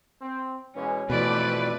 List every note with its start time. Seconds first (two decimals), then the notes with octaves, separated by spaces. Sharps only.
0.21 C4
0.75 B2 E3 G#3 C#4
1.10 F2 B2 E3 A3 B4 D5